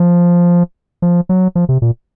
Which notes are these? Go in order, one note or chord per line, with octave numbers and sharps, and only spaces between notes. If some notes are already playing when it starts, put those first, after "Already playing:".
Already playing: F3
F3
F#3
F3
C3
A#2